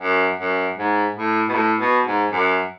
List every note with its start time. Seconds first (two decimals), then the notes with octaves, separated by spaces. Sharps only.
0.01 F#2
0.39 F#2
0.78 G#2
1.16 A2
1.49 B2
1.54 A2
1.80 B2
2.06 G#2
2.32 F#2